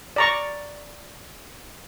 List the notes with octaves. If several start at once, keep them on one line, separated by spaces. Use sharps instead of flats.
D5 A#5 C#6